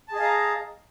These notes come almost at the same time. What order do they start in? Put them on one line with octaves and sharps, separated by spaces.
A5 G#4 D#5 F5 A#5